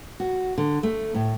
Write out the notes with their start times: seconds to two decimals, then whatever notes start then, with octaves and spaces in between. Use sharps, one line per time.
0.20 F#4
0.58 D3
0.83 A3
1.14 A2